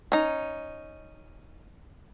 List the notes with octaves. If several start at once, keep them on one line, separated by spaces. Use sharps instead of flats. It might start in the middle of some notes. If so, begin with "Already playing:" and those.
C#4 D#4